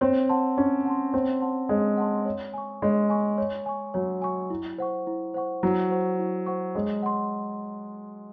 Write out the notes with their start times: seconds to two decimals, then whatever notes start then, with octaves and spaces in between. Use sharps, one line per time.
0.01 C4 C#5
0.29 F#5 A5 C6
0.57 C#4 C#5
0.85 F#5 A5 C6
1.13 C4 C#5
1.41 F#5 A5 C6
1.69 G#3 C#5
1.97 F#5 A5 C6
2.26 C#5
2.53 G#5 C#6
2.82 G#3 C#5
3.10 G#5 C#6
3.38 C#5
3.66 G#5 C#6
3.94 F#3 C#5
4.22 G#5 C#6
4.50 E4
4.78 C5 F#5 C#6
5.07 E4
5.34 C5 F#5 C#6
5.63 F#3 E4
5.90 C5 F#5 C#6
6.19 E4
6.46 C5 F#5 C#6
6.75 G#3 C#5
7.03 F#5 C6